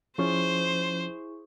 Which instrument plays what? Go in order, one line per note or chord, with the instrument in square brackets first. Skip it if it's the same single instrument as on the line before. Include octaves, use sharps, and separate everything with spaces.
[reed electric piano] F3 C#4 [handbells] E4 G#4 C#6 [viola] C5